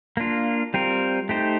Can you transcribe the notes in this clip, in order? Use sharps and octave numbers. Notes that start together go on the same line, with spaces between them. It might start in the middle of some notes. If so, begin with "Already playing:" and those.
A#3 D4 F4
G3 C4 F4 A#4
A3 D#4 G4 C5